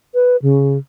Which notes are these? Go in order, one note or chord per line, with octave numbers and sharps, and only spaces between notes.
B4
C#3